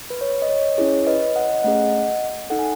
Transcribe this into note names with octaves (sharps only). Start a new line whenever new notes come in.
B4
C#5
D#5
C#5
C#4 E4 G#4 C#5
B4 D#5
D#5 F#5
A3 C#4 G#4 D#5 F#5
D#4 A4 F#5
G#5